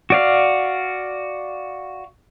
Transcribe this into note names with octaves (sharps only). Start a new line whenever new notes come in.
F#4 D5 F5